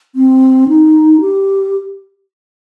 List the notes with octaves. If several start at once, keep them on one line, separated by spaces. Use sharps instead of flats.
C4
D#4
G4